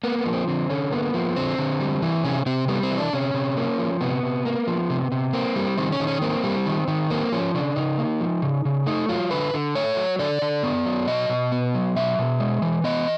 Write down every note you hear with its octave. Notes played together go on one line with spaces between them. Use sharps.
A#3 B3
B3
F3
C4
D3 C4
D3 C#4
A#3 B3
F3
D3 C4
D3
G3
E3
C3 C#4
C3 C4
G3 B3
C4
E3
D4
C3 C#4
C3
A#3
F3
C3 B3
C3
A#3
F3
C3
C3
A#3 C4
G3
D#3 C4
C#4
D#3
C#4
A#3 C4
G3
D#3
D#3
A#3 C4
F3 C#4
C#3 D4
C#3 D#4
A#3
F3
C#3
C#3
A3 D#4
F#3 F4
D3 B4
D3
A3 C#5
F#3
D3 D5
D3
B3
F#3
B2 D#5
B2
B3
F#3
B2 E5
B2
G#3
E3
B3 D#5